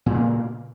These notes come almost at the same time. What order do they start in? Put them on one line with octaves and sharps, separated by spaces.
A#2 C#3 A#3